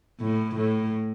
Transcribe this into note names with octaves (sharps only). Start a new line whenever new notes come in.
A2
A2